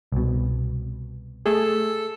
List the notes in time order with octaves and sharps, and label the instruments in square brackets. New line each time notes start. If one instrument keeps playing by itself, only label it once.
[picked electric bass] C2 B2
[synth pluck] A3 G#4 [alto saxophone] A4